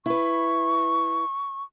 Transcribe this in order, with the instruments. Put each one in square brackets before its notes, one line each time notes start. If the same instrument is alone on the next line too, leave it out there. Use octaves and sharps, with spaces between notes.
[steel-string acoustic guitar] E4 B4 [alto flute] C#6